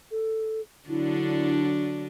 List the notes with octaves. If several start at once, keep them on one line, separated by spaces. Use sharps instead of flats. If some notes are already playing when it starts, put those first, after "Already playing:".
A4
D3 F#3 D4 E4